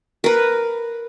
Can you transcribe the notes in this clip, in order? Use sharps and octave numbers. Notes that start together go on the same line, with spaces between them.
A#4 B4